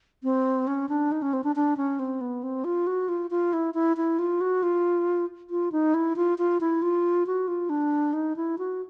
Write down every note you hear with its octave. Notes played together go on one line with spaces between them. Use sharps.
C4
C#4
D4
D#4
C#4
C4
D4
D4
C#4
C4
B3
C4
F4
F#4
F4
F4
E4
E4
E4
F4
F#4
F4
F4
D#4
E4
F4
F4
E4
F4
F#4
F4
D4
D#4
E4
F#4